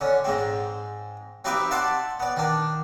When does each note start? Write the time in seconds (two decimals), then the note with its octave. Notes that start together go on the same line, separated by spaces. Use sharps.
0.01 D3 C#4
0.24 G#2 G#3 C4
1.45 C4 D#4 G4 B4 E5 D6
1.71 D5 E5 F#5 A5 C6 D6
2.20 B3 D5
2.36 D#3 D4